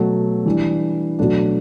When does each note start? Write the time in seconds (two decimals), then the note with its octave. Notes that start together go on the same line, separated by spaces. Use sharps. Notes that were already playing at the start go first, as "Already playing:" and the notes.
Already playing: B2 F#3 A3
0.46 E3 G3 D4
1.19 B2 F#3 A3 D4